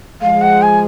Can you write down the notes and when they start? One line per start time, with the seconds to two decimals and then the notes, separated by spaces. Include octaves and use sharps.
0.22 F3 G#3 F5
0.41 F#5
0.62 G#5